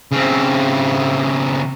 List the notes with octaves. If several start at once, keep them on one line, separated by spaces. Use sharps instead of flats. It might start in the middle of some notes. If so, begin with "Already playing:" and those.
C#3 C4